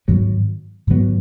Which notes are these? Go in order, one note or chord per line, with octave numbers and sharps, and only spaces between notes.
G#2 D#3 F#3 B3
G#2 D#3 F#3 B3